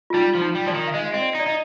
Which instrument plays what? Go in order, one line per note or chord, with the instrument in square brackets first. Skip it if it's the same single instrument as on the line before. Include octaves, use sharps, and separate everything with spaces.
[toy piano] F4
[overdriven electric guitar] G3 [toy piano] D#4
[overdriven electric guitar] F3
[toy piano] D#4
[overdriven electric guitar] G3
[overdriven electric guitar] F3 [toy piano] D5
[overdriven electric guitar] D#3
[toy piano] F5
[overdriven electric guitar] G#3 [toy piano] D#5
[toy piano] F5
[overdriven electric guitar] C4 [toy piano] D#5
[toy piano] D5
[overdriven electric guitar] D#4
[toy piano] D5
[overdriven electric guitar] D#4 [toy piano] D#5